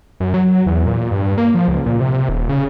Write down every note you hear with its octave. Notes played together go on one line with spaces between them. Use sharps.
F#2
F#3
E2
A#2
G2
A#3
F3
C#2
A#2
C3
D#1
C#3